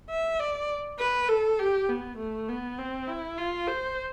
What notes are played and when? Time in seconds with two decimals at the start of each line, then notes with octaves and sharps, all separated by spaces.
0.10 E5
0.40 D5
0.99 B4
1.28 A4
1.59 G4
1.89 B3
2.18 A3
2.49 B3
2.78 C4
3.07 E4
3.38 F4
3.67 C5